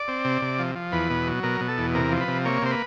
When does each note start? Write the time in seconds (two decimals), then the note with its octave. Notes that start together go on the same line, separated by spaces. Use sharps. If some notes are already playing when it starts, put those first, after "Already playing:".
Already playing: D5
0.08 C4
0.25 C3
0.42 C3
0.59 F3
0.75 F3
0.92 E2 B4
1.10 B2
1.27 F#3
1.43 B2 A#4
1.61 B2
1.68 A4
1.78 E2
1.95 C3 A#4
2.11 F3
2.20 B4
2.28 C3
2.45 A#3 C#5
2.62 C3 C5
2.71 B4